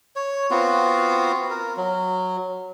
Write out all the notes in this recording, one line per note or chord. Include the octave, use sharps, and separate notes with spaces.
C#5
B3 C4 F4 F#4
A#4
F#3